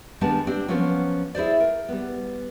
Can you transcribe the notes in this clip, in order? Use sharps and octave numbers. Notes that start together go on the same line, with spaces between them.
D#3 G3 G#3 B3 D4 A5
C4 D4 G4
F3 F#3 A#3 B3 C#4 F4
E4 G#4 C5 D5
A#4
G3 B3